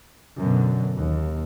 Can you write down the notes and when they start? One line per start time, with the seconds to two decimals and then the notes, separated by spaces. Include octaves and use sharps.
0.38 F#2 B2 D3
0.98 D#2